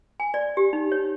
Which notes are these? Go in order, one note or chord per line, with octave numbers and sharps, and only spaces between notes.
G#5
D5
G4
D#4
C#5